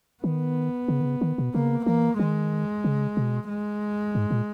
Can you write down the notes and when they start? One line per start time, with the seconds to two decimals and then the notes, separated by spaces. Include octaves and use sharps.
0.24 D#3 B3
0.88 C#3
1.01 D#3
1.05 C#3
1.21 D#3
1.38 B2
1.54 C#3 A#3
1.86 E3 A#3
2.19 D#3 G#3
2.84 C#3
3.17 B2
3.49 G#3
4.15 G#2
4.31 A#2